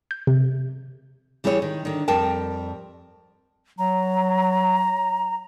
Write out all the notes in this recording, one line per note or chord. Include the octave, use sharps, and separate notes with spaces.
G6
C3
E3 G3 E4 G#4 C#5
D#3
D3 D#3
F2 G3 A#4 G5 A5
F#3 A#5